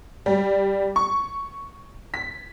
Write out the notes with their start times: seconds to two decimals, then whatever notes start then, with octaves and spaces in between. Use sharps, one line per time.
0.26 G3
0.96 C#6
2.14 B6